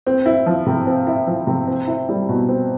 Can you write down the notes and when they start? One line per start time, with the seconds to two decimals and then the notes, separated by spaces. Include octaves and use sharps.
0.07 C4
0.26 E4
0.46 F3
0.66 C3
0.87 C4
1.07 E4
1.27 F3
1.47 C3
1.67 C4
1.88 E4
2.09 G3
2.29 B2
2.49 C4